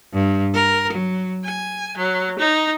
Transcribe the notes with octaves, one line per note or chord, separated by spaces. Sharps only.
G2
A#4
F#3
G#5
F#3
D#4